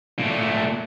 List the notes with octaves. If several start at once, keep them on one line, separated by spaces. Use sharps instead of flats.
A#2 A3